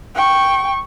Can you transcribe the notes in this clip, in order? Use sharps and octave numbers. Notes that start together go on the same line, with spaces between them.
G5 C#6